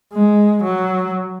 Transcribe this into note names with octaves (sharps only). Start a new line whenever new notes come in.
G#3
F#3